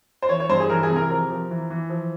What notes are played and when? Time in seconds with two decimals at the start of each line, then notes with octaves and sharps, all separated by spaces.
0.22 C5
0.29 E3 C#5
0.40 C#5
0.49 G2 C5
0.60 G#4
0.70 E3 A#4
0.83 G#4
0.90 C3
0.96 A#4
1.10 F3 A#4
1.30 F3
1.51 E3
1.70 E3
1.90 F3